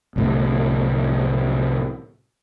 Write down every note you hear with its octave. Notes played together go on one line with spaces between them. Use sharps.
C2 A2 D3